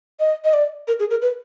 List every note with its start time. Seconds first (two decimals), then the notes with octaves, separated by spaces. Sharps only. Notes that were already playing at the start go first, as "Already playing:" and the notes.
0.20 D#5
0.44 D#5
0.53 D5
0.88 A#4
0.99 G#4
1.11 A#4
1.22 B4